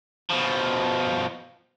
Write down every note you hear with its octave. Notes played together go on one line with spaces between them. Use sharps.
B2 F3